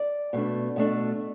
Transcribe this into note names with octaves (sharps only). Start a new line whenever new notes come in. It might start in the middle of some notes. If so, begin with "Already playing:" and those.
Already playing: D5
B2 A3 D4
B2 A3 D4